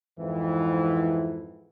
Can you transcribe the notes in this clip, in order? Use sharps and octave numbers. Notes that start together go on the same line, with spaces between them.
F2 G#2 E3